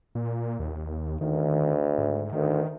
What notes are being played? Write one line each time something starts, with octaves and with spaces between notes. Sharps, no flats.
A#2
D#2
D2 D#3
G#2
D2 D#3